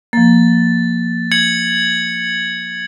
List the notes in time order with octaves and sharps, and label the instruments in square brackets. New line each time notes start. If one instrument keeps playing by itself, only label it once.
[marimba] F3 A#3 [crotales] A6
[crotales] G#6 C#7 F#7